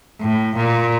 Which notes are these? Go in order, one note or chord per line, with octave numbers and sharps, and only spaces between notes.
A2
A#2